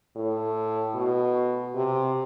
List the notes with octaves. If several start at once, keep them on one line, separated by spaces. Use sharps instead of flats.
A2
B2
C3